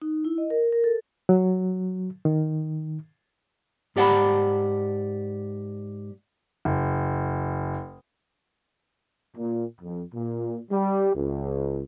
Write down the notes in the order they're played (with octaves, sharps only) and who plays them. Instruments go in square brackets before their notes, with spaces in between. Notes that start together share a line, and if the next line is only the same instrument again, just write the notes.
[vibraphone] D#4
E4
D#5
A#4
A#4
A4
[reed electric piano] F#3
D#3
[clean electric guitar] G#2 G4 D5 F#5 A5 B5
[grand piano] F#1
[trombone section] A#2
F2
A#2
G3
C#2